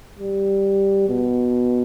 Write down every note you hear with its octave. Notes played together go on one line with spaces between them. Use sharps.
G3
B2